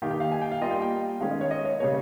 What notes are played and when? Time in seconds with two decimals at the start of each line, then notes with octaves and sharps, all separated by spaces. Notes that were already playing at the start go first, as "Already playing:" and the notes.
0.02 D#3 A#3 D#4 G4 F5
0.11 G5
0.20 F5
0.32 G#5
0.42 G5
0.52 F5
0.61 G3 A#3 F4 D#5
0.71 G5
0.81 G5
1.21 D#3 G#3 C#4 F5
1.31 D#5
1.41 C#5
1.51 D#5
1.65 C#5
1.80 C#3 G3 A#3 C#5